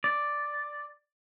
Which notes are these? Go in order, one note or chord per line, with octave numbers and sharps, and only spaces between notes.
D5